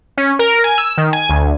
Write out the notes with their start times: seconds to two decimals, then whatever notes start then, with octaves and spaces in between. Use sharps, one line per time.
0.18 C#4
0.39 A#4
0.64 G#5
0.78 E6
0.98 D#3
1.13 G#5
1.29 D2